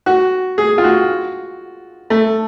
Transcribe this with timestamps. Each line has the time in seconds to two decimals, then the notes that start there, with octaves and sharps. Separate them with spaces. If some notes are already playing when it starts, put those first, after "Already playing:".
0.06 F#4
0.58 G#4
0.78 F4
0.84 F#4
2.10 A3